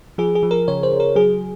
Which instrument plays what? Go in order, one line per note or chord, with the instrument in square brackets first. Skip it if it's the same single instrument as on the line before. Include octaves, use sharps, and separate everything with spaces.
[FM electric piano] F3 G#4
G#4
F3
A#4
C#3 C#5
C5
C#3
A#4
F#3 G#4